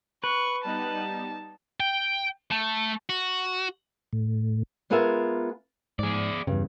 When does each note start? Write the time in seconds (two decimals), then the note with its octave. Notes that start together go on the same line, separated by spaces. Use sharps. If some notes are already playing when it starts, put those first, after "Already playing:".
0.24 B4 C#6
0.64 G3 B3 D#4 A5
1.80 G5
2.52 A3
3.09 F#4
4.13 A2
4.90 G#3 B3 F4 G#4 A#4 E5
5.99 G#2 G#4 D5
6.47 E2 G2 C#3